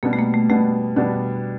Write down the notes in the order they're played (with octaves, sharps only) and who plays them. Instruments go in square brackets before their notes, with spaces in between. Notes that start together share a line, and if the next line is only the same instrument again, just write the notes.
[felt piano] B2 G3 B3 D4 [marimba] A#3
[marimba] A3
A#3
A3
[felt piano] B2 G3 B3 D4 [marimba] A3
[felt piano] B2 G3 B3 D4